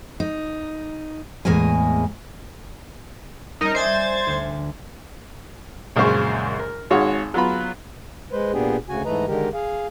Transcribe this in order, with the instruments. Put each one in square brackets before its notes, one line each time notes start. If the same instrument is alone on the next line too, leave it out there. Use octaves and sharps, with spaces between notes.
[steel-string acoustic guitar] D#4
E2 A2 G#3 A#3 A#4 G#5
[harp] G3 C#4 [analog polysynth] D#4 A#4 D#5
[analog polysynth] C5 G#6 A6 [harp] D5 E5 G#5
[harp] D2
[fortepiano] A#1 F#2 C#3 G#3 C5 C#6
A#4
G#1 G#2 F#4 G#4 C#5 F5
F#3 B3 F4 A#5 B5
[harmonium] G#3 B4 C5
A#2 B3 D4 G4 G#4
D2 C#3 F#4 G#5
G#2 E3 A3 B4 D#5 A#5
D3 D#3 G#3 G4 A#4
G#4 F5